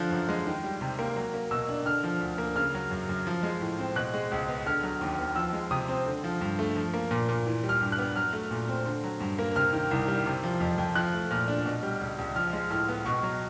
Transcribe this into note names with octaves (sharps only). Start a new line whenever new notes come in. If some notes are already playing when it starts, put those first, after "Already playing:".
Already playing: D3 F3 F#6
F#2
G#3
D#3
G3
C3
A#3
F#3
A#3
B2 E6
D4
D3 F6
F3
D2
A#3
C#3 F6
F#3
F#2
F#2
F3
G#3
A2
C4
B2 F#6
G#3
C#2
B3
D3 F6
F#3
D#2
B3
F3 E6
G#3
C3 D#6
C4
D3
F3
G2
A3
F3
A#3
A#2
A#2
E3
G3
F6
G2
F#6
B3
F#3 F6
A3
A#2
C4
D3
F#3
G2
A#3
C3 F6
D#3
C2
G3
C3
F3
F2
F2
F3 F#6
A3
A#2 F6
D4
B2
G3
C#2
C#2
F3 F6
G#3
A2 F6
B3
B2 C#6
F#3